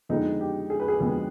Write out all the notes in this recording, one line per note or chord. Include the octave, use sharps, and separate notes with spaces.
F2 D3 G#3 B3 D#4
G4
G#4
B4
G#4
F2 D3 G#3 B3